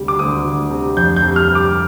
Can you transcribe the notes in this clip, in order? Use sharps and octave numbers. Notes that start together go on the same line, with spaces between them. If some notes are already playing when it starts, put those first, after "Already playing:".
Already playing: D2 C3 G3
D6
D2 D#6
D2
C3
F2 G6
G6
C3
F6
G3
D6